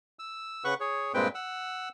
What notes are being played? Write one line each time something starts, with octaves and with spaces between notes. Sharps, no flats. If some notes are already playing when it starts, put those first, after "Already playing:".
E6
C#3 B4 F#5 C#6
G#4 C#5
G2 A#2 G#3 C4 B4 G5
F#5 E6